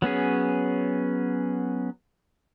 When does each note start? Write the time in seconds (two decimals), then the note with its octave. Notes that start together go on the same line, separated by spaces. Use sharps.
0.02 F#3 B3 C#4 G#4